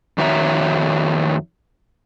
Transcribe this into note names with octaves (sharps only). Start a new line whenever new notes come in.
F2 D#3 F#4 C#5 E5 A#5